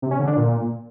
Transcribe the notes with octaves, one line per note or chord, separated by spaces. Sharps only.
C3
C#4
D3
D4
A#2